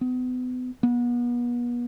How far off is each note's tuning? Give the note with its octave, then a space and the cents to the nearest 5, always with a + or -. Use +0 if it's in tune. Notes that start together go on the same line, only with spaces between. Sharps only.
B3 +35
B3 -35